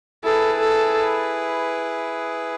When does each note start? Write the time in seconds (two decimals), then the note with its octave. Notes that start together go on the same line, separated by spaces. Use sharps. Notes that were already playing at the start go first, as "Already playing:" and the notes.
0.23 E4 G#4 A4 B4
0.60 A4